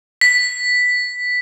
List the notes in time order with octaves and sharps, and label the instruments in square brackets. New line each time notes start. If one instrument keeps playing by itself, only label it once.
[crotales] B6